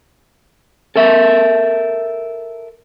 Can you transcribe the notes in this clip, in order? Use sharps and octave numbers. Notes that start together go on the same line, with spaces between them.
A4 A#4 E5